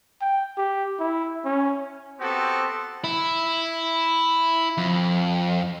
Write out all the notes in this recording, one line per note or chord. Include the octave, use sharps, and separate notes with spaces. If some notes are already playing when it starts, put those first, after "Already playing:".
G5
G4
E4
C#4
B3 C4 F#4 G4 A4
E4
F2